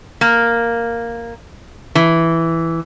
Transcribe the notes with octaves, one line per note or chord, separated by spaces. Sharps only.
A#3
E3